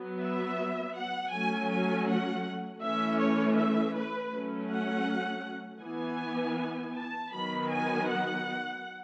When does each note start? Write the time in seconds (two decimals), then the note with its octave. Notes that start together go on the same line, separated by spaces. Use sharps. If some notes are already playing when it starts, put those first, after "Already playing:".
Already playing: F#3 B3
0.20 E5
0.96 F#5
1.32 F#3 A3 C#4 G#5
1.71 G#5
2.08 F#5
2.82 E3 A3 C#4 E5
3.20 C#5
3.57 E5
3.96 B4
4.33 F#3 A3 C#4
4.70 F#5
5.83 E3 B3 G#5
6.95 A5
7.33 D#3 F#3 B3 B5
7.71 G#5
8.09 F#5